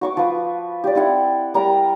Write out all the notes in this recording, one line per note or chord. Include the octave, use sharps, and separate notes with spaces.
F#4 C#6 D6
F3 B4
G4 D5
C4 E4 F#5
G3 A#4 A#5